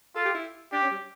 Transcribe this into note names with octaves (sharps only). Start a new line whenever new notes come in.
F4 A4
G4
E4
D4 G4
C#4
G3